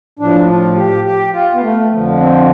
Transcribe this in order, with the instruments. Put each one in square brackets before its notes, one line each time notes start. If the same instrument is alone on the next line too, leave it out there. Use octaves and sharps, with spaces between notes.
[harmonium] A2 F3 D4
F4
G4
G4
F4
B3
A3
F2 D3 F3
C4